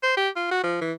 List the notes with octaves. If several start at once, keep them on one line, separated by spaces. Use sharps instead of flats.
C5
G4
F4
F#4
F3
E3